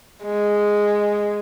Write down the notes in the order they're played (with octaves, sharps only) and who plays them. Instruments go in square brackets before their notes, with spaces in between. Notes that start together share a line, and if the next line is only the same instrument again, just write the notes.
[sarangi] G#3